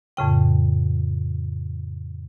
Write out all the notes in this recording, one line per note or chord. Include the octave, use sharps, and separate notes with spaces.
F2 A2 C#3 G5